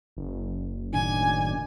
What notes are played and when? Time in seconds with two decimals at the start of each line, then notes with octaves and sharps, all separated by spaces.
0.17 F#1
0.93 A2 D#3 D4 G#5